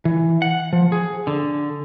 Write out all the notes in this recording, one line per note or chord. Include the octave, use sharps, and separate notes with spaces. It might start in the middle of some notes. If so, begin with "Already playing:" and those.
E3
F#5
F3
G#4
D3